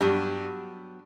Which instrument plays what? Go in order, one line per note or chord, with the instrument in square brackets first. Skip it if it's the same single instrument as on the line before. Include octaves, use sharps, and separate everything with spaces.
[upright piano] G2 G3 [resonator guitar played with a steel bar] F#3 B3 D4 G4